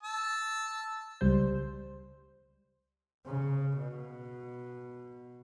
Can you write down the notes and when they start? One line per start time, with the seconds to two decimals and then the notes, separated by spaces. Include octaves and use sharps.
0.03 A5 E6
1.21 C#2 G3 C5
3.26 C#3
3.78 B2